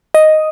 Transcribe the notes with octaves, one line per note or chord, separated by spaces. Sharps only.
D#5